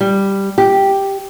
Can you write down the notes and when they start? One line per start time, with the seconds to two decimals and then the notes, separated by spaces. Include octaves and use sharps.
0.01 G3
0.58 G4